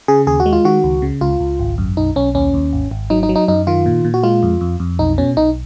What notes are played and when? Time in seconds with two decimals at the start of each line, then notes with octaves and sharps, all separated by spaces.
0.08 C#3 G#4
0.27 D#2 G#4
0.40 F#4
0.46 G#3
0.53 F4
0.65 D#3 F#4
0.84 C#2
1.02 C#3
1.21 C#2 F4
1.40 C#2
1.59 G#1
1.78 F#2
1.97 B1 D#4
2.16 B1 C#4
2.35 D#2 C#4
2.54 D#2
2.73 G#1
2.91 G#1
3.10 F#3 D#4
3.23 D#4
3.29 F#3
3.36 D#4
3.48 F#2 D#4
3.67 D#3 F4
3.86 A#2
4.05 A#2
4.14 F#4
4.23 G#3 F4
4.43 F2
4.61 F2
4.80 F2
4.99 B1 D#4
5.18 B2 C#4
5.37 B1 D#4